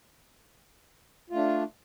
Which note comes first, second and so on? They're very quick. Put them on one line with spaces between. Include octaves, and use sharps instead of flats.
F4 A3 D4